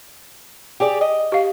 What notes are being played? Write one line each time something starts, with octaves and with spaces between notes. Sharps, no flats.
G4 G#4 D5
D#5
G4 F5